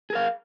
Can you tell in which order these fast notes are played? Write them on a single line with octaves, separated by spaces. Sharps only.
G#4 A#4 F5